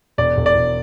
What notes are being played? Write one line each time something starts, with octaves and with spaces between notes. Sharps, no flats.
E1 D5
E1
D5
E1